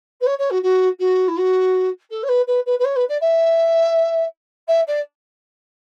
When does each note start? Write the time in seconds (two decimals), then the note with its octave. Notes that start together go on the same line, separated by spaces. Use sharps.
0.21 B4
0.26 C#5
0.38 C#5
0.50 F#4
0.62 F#4
0.99 F#4
1.28 E4
1.37 F#4
2.10 A4
2.23 C#5
2.28 B4
2.47 B4
2.66 B4
2.79 B4
2.84 C#5
2.96 B4
3.08 D5
3.21 E5
4.68 E5
4.87 D5